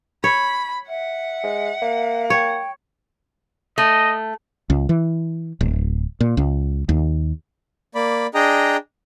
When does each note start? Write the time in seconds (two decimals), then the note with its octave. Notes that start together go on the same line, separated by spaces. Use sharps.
0.24 C#5 B5
0.89 E5 F#5
1.44 G#3
1.82 A#3
2.30 C#5 G5
3.78 A3 D#5
4.70 C#2
4.89 E3
5.61 D1
6.21 A#2
6.37 C#2
6.89 D#2
7.95 A#3 D5 B5
8.34 D4 G#4 D#5 G5 A#5